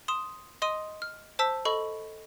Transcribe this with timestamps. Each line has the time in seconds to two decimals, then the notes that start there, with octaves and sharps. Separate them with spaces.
0.08 C6 D#6 E7
0.62 D#5 C6 D#6 D#7
1.02 F6
1.39 C5 A5 E6 B6
1.65 A4 D#5 B5 C#6